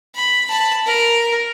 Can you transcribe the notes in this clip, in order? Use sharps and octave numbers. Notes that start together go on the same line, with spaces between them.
B5
A5 B5
A#4